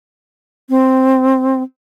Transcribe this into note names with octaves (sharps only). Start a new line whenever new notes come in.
C4